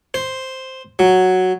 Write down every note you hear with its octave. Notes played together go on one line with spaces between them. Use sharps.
C5
F#3